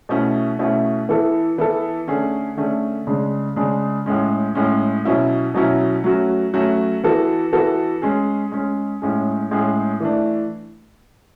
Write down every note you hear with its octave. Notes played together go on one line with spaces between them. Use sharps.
B2 A3 C#4 E4
B2 A3 C#4 E4
E3 B3 E4 A4
E3 B3 E4 A4
D3 A3 C#4 G#4
D3 A3 C#4 G#4
C#3 G#3 D4 G#4
C#3 G#3 D4 G#4
A2 G#3 C#4
A2 G#3 C#4
B2 F#3 C#4 E4
B2 F#3 C#4 E4
F#3 A3 C#4 F#4
F#3 A3 C#4 F#4
E3 B3 F#4 A4
E3 B3 F#4 A4
G#3 C#4 G#4
G#3 C#4 G#4
A2 G#3 C#4 G#4
A2 G#3 C#4 G#4
E3 A3 D4